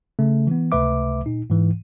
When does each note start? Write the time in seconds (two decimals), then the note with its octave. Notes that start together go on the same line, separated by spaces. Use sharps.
0.19 C#3 A3
0.47 E3 B3
0.72 C#2 C3 A3 B4 E5 D6
1.26 A#2 D#4
1.50 G#2 E3